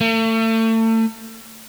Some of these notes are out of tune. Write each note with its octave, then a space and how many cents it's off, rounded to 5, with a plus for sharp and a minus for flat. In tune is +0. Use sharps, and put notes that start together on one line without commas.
A3 +35